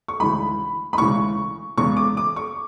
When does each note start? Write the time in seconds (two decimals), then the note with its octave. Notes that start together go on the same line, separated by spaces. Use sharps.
0.08 C#6
0.20 D2 C#3 E3 G#3 B5
0.93 B5
0.98 D2 C#3 E3 G#3 C#6
1.77 E2 C#3 G#3 C#6
1.97 D6
2.17 D6
2.36 C#6